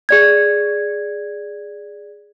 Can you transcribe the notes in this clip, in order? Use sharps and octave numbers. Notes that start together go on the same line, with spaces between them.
G#4 D5 G#6